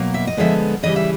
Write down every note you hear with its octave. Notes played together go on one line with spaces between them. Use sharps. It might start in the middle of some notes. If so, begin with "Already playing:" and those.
Already playing: B2 F#3 A#3
E5
D#5
D3 F3 G#3 B3 D5 E5
C#3 E3 G3 D#5
E5